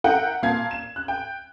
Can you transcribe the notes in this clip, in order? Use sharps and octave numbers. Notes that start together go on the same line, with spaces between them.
E4 A#4 F#5 G5
A#2 A#3 F5 A5 G#6
E7
F#6
G5